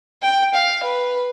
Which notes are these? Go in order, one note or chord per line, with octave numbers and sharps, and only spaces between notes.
G5
F5
B4